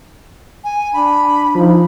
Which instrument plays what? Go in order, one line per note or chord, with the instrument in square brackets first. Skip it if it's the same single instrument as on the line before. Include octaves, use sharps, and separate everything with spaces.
[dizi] G#5
[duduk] D4 [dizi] B5
[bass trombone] F3 [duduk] D#4